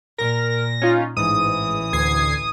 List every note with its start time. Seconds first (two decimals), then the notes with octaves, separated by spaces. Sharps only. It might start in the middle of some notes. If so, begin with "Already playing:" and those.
0.18 A#2 A#4 A#6
0.82 C#4 D#4 F4
1.17 A1 G#2 E3 D#6
1.93 D2 G#6 C7